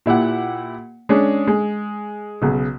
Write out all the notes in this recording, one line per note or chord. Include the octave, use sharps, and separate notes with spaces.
A#2 E4 G4 F#5
G#3 C#4 D4
G#3
B1 C#3